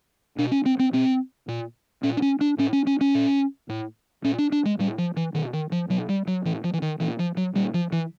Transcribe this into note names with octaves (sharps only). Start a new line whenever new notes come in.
B2 D4
C#4
C4
C4
B2 C4
A#2
A#2 C#4
D4
C#4
D4
A2 C#4
C#4
C#4
C#4
A#2
A2
A#2 C#4
D4
D4
G#3
A2 G3
F3
E3
B2 D#3
D#3
F3
B2 F#3
G3
F#3
A2 E3
F3
E3
D#3
A#2 E3
F3
F#3
A#2 G3
F3
E3